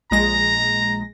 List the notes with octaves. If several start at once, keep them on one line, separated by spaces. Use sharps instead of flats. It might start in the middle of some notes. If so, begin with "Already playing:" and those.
A#1 G#3 A#5 A#6